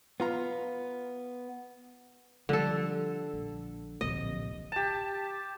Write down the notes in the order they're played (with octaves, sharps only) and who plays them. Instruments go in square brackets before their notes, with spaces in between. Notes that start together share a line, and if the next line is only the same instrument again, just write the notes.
[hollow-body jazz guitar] B3 F4 A#5
[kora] D3 A4 [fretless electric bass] F3 G3
[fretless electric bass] A#1
[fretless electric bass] D1 A#1 C3 [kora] D#5
[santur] G4 A5